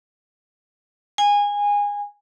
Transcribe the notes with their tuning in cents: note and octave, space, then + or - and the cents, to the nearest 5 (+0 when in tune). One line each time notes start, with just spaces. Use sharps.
G#5 -20